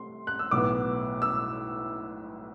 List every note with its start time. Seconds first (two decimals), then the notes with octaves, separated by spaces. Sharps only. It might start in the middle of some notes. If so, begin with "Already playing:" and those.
Already playing: C3 A3 C6
0.27 F#6
0.39 E6
0.51 B1 A2 E3 B3 D6
1.22 E6